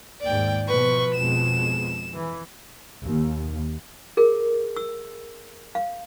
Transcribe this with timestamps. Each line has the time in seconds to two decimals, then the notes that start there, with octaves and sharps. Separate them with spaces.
0.21 D#2 G#2 D5 G5
0.67 B2 F3 B4 C#6
1.15 F2 B2 G#3 E7
2.14 E3
3.03 D#2
4.17 G#4 A#4
4.76 E6
5.75 F5